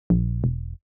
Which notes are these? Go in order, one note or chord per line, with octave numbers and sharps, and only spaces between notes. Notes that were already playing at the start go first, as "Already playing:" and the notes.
A#1
E1